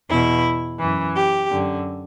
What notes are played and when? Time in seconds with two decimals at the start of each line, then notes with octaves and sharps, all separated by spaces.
0.09 E2 B2 E4
0.80 F#2 E3
1.16 G4
1.52 F#2 D3